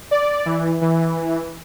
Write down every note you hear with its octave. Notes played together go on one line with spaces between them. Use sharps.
D5
E3
E3